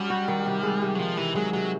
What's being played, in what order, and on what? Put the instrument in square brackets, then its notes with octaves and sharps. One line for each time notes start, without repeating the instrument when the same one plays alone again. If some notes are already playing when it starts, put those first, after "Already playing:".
Already playing: [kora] F#3 C#4 [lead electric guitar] G3
[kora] F#4
D#3
C3
G#3
C3
[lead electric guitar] F#3
[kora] D#3 [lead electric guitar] F3
[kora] C3 [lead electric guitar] E3
[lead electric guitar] F#3 [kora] G#3
[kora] C3 [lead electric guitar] F#3